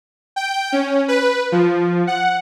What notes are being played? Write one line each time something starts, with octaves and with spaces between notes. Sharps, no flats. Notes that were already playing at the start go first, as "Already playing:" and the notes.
G5
C#4
B4
F3
F#5